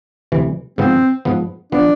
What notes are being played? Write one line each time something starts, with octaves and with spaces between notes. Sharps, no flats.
D2 C3 E3
G#2 F3 B3 C4
G#2 F3 B3
F3 B3 D4